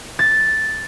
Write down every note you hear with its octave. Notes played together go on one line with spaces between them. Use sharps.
A6